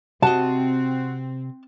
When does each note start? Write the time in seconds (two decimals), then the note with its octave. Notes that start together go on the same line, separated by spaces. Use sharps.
0.22 C3 C4 F#4 D#5 A5